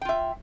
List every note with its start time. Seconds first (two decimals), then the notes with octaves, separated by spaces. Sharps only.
0.01 G5
0.05 F4
0.09 E5